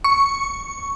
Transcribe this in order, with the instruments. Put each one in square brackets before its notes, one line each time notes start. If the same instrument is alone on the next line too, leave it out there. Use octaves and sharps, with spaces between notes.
[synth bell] C#6